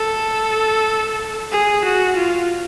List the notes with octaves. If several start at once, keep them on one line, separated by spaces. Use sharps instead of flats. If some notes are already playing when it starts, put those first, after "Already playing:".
Already playing: A4
G#4
F#4
F4